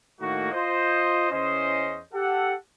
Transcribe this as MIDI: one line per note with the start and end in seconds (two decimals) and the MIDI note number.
0.21 0.52 45
0.21 0.52 51
0.21 0.52 57
0.21 0.52 58
0.21 0.52 63
0.21 0.52 66
0.52 1.29 65
0.52 1.29 72
0.52 1.29 75
1.31 2.00 40
1.31 2.00 61
1.31 2.00 72
1.31 2.00 75
2.14 2.54 67
2.14 2.54 69
2.14 2.54 78